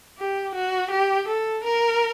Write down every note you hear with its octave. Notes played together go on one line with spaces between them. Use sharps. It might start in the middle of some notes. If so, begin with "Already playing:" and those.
G4
F#4
G4
A4
A#4